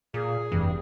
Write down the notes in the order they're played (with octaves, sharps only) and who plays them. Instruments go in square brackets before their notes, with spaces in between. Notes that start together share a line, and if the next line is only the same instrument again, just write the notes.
[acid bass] A#2 [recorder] G#4
[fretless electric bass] F1 E3 [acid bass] G2